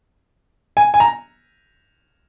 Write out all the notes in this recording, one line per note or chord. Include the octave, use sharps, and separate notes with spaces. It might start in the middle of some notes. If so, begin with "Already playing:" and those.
G#5
G#5
A#5